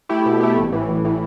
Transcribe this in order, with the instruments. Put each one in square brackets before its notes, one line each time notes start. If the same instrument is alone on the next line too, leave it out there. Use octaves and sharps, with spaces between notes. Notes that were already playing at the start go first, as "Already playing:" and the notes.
[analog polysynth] A3 E4 G4
B2
A3 E4 G4
A1
A2 E3
A1
A2 E3